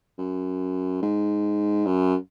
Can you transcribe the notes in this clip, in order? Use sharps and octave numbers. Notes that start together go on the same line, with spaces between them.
F#2
G#2
F#2